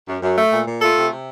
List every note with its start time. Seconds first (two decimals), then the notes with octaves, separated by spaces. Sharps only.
0.08 F#2
0.22 F#2
0.38 A3
0.52 A#2
0.67 A#2
0.81 A3 F4 A4
0.97 C3
1.12 C3